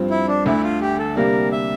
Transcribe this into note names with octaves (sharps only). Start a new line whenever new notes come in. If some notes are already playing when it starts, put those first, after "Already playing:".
Already playing: G2 F3 C4
E4
D4
D2 D3 A3 E4
F4
G4
A4
C3 G3 A#3 D4 A#4
E5